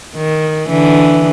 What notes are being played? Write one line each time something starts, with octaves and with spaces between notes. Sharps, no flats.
D#3
D3 E3